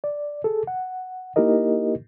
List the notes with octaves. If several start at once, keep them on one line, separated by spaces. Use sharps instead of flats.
D5
G#4 A4
F#5
A#3 D#4 E4 G4 A#4 D#5